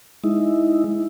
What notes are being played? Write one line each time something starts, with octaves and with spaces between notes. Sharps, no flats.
G#3 D#4 E4